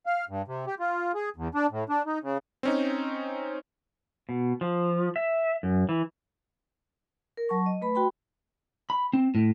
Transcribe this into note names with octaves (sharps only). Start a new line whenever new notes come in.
F5
G2
C3
G4
F4
G#4
E2
D4
A2
D4
D#4
C#3
C4 C#4 D#4
B2
F3
E5
F#2
E3
A#4
F#3 A5 C#6
D#5
A3 B4 B5
F#4 G5 B5 C6
B5
C4
A2